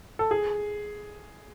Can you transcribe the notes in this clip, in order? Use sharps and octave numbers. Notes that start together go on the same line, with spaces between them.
A4
G#4